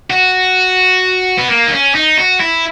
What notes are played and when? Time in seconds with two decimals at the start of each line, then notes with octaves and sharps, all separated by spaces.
0.10 F#4
1.38 B3
1.48 A#3
1.67 D#4
1.72 C#4
1.95 D#4
2.18 F#4
2.41 E4